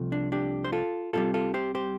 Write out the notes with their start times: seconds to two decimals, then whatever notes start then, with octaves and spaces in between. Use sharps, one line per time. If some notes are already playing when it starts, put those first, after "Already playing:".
Already playing: C2 C3 F3 A3
0.12 D4
0.32 D4 G4
0.64 C5
0.72 F4 A4
1.13 C2 C3 G3 F4 A4
1.34 F4 A4
1.54 G4 C5
1.75 G4 C5